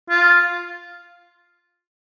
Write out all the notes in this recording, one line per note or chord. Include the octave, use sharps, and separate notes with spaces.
F4